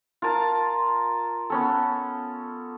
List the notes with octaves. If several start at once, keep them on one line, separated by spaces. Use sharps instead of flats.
F4 A#4 A5
B3 C#4 A4